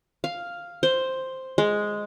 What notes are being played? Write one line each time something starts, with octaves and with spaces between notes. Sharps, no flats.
F5
C5
G#3